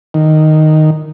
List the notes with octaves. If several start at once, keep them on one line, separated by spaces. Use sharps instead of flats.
D#3